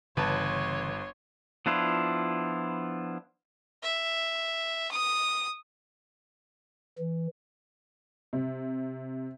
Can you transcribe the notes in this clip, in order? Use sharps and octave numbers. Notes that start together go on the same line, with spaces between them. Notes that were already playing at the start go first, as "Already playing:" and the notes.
G1 C#3 E3 B4 C#5 A5 C6
F3 B3 D4 E4 F4
E5
D#6
E3
C3